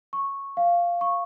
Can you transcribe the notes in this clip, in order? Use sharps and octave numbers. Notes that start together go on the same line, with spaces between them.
C#6
F5
C#6